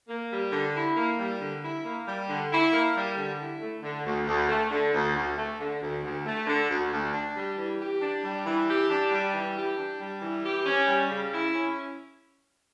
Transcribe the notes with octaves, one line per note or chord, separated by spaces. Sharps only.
A#3
G3
D3
E4
A#3
G3
D3
E4
A#3
G3
D3
E4
A#3
G3
D3
E4
A3
D3
D2
D2
A3
D3
D2
D2
A3
D3
D2
D2
A3
D3
D2
D2
D4
G3
E3
G4
D4
G3
E3
G4
D4
G3
E3
G4
D4
G3
E3
G4
C#4
G3
C#3
E4
C#4